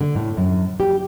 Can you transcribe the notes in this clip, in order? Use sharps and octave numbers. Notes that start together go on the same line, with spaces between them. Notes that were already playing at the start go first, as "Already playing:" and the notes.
D3
A2
F#2
G4